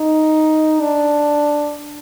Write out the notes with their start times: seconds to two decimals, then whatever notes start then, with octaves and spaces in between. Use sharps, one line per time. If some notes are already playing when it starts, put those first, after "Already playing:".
Already playing: D#4
0.80 D4